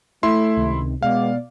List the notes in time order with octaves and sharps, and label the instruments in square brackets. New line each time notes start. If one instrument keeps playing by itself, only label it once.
[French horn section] A3 [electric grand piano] E4 E5 C6
[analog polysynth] C#2 C3 D#3
[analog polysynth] B2 D5 [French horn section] G#3 B3 [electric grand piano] F5